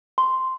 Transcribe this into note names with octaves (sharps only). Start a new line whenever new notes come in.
C6